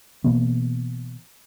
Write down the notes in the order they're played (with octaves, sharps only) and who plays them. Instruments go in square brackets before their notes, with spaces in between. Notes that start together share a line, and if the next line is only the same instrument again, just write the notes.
[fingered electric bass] B2 E3 A#3 B3